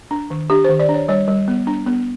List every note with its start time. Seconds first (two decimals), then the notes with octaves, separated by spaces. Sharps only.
0.11 D4
0.30 D#3
0.50 D4 G4
0.65 C5
0.69 D#3
0.79 D5
0.89 D4
0.94 C#5
1.08 G3 C#5
1.28 G3
1.48 B3
1.67 D4
1.87 B3